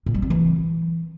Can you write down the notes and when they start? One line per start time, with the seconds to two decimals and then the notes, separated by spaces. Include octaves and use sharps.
0.06 A#2
0.14 G3
0.22 C4
0.30 E3